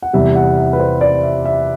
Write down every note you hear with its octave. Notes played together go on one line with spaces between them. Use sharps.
F#5
E2 C3 G3 E5
F#5
E5
B4
C5
D5
E5
E5